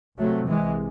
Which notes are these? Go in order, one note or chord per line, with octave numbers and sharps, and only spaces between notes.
C2 C3 F#3 A3
E3 G#3